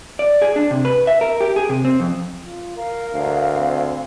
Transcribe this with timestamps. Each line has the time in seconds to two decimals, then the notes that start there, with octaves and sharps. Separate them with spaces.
0.19 D5
0.42 G#4
0.56 D4
0.71 C3
0.85 B4
1.07 E5
1.21 A#4
1.41 G4
1.56 G#4
1.69 C3
1.85 C4
2.00 F2
2.41 F4
2.76 A#4 F5
3.13 D2
3.56 C4